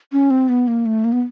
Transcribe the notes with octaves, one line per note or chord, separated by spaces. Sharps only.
C#4
C4
B3
A#3
A3
A#3
B3